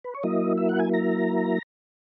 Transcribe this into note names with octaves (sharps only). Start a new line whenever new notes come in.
B4
C#5
F#3 A#3 E4 D#5
E5
F#5
G#5
A#5